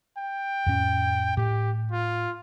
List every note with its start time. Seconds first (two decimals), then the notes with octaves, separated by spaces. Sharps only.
0.18 G5
0.66 F2 A2 C#4
1.37 A2 G4
1.92 F4